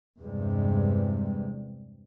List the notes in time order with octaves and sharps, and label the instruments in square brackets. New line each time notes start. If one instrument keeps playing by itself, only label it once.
[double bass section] E2 G2 C3 G3 G#3